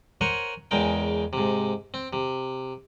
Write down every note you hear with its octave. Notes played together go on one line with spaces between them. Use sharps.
A#4 C5 C#5 F#5 G#5
E2 C#3 G#3 A#4 G5
G#2 C3
C4
C3